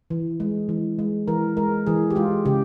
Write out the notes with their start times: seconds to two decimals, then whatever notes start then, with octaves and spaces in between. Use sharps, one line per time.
0.10 E3
0.40 G#3
0.69 E3
0.99 G#3
1.28 E3 A#4
1.57 G#3 A#4
1.87 E3 G#4
2.10 G4
2.15 G#3 F4
2.45 C#3 G4